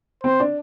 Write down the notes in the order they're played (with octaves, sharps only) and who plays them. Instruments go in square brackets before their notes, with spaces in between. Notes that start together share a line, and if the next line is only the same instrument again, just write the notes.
[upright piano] C4 [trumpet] C5
[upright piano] D4